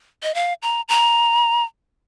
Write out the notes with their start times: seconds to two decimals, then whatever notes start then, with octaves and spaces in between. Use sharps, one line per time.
0.23 D#5
0.35 F5
0.62 A#5
0.89 A#5